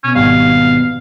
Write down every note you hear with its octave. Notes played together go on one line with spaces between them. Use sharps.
B2 C#4
G#1 G3 F5